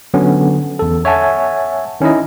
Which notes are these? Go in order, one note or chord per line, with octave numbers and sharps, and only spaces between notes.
D3 F#3 B3 C#4
E2 A4
C#5 E5 F#5 G#5 A5
D#3 C#4 D#4 E4 D#5